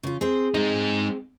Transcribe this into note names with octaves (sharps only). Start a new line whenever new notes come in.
C#3 F4
C4 G#4 C5
G#3 C4 D#4